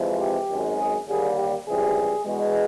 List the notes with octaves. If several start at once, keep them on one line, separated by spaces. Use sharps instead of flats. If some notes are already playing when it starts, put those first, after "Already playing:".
Already playing: F2 C3 E3 G#3
G4
G#1 F#2 D#3 G#3
G#4
D#2 D3 G3 A#3 G#4
G4
C#2 C3 E3 G3 G#4
E2 B2 G#3